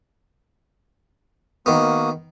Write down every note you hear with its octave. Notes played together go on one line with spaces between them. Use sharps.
D#3 A#3 B3 F#4 D#6